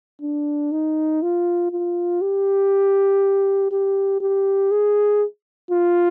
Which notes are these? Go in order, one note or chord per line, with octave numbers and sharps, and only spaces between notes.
D4
D#4
F4
F4
G4
G4
G4
G#4
F4